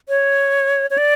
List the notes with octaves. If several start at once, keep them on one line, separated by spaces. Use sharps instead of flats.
C#5
C#5
D5